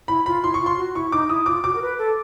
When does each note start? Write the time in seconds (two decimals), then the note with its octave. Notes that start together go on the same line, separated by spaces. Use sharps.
0.08 E4 B5
0.26 F4 B5
0.43 E4 C6
0.54 C#6
0.60 F4
0.66 C6
0.78 F#4
0.95 E4 C#6
1.12 D#4 D6
1.29 E4 D#6
1.46 F4 D6
1.63 F#4 D6
1.75 A#4
1.82 B4
1.98 A4